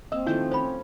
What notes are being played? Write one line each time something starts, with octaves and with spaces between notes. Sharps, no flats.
A#3 C4 D#5 E6
D#3 F3 A3 E4 G#5 G6
C#4 C5 B5